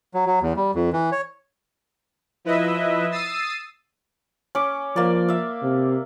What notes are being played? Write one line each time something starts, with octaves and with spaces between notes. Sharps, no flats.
F#3
F#3
E2
G3
F2
E3
C#5
F3 E4 B4 D#5 E5
D#6 E6 A6 C7 D#7
C#4 D6
F3 A#3 D5
E5 F5
C3